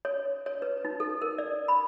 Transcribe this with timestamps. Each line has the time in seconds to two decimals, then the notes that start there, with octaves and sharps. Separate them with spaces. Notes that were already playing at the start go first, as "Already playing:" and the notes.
0.05 C#5
0.46 C#5
0.62 B4
0.85 D#4
1.00 A4
1.22 A#4
1.38 D5
1.68 B5